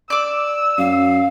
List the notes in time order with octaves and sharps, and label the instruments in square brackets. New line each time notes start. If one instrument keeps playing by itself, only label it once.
[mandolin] D5 D6 [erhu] E6
[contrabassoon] F#2 [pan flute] F5